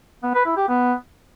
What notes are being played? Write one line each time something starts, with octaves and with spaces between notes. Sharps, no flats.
B3
B4
E4
G4
B3